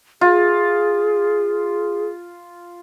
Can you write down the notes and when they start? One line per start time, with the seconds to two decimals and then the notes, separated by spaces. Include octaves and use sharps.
0.21 F4 G#4